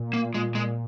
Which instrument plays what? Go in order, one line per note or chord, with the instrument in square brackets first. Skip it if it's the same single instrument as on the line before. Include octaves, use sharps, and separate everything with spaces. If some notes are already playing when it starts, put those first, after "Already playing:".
Already playing: [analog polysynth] A#2
[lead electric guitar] A#3
[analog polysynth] A#2 [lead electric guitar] G#3
[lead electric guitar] G#3